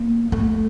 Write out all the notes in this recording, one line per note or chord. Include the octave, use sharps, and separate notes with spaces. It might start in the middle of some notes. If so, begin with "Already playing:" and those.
Already playing: A#3
A3